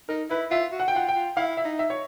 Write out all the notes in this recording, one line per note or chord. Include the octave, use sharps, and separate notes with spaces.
D#4 A#4
E4 B4
F4 E5
F#4
F#5
G5
F4 F#5
G5
F4
E4 F5
E5
D#4
E5
C#5